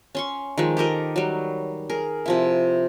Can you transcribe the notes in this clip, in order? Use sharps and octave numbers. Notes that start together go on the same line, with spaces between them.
C#4 C6 C#6
D#3 F3 G#3
G4 A4 A#4 D#5
F#3 G3
G#4 A#4
C3 F3 E4